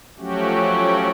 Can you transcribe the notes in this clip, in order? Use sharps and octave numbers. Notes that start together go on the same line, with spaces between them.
F3 F#3 A3 C#4 F#4 G4